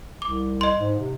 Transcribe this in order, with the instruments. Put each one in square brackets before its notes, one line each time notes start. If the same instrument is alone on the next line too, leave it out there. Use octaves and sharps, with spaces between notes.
[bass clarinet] C2 [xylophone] D6
[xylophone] D#5 C6
[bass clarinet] G#2
C3